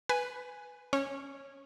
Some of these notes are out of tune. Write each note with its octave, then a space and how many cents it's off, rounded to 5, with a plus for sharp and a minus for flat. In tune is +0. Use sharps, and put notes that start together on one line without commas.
B4 +0 G#5 +0
C#4 -10 C#5 -20